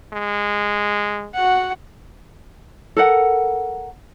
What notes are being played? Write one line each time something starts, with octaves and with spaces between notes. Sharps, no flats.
G#3
F#4 F#5
A4 A#4 F#5